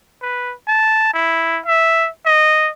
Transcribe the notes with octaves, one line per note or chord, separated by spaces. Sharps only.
B4
A5
E4
E5
D#5